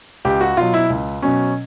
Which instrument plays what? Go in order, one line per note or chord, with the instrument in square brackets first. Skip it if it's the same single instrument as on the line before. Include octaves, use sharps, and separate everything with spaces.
[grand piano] C#2 G4
F#4
B2 F#3 F4
E4
C#2
B2 F#3 C#4